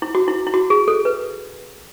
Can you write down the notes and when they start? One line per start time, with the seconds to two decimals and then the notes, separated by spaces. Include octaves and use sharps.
0.02 E4
0.15 F#4
0.28 E4
0.47 E4
0.54 F#4
0.70 G#4
0.88 A4
1.05 B4